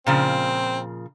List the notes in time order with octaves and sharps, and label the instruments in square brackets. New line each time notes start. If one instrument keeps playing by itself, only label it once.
[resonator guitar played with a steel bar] A#2 C#3 F3 [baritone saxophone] C4